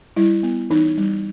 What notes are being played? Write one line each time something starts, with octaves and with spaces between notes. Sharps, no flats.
G3 E4
B3
E3 D#4
G3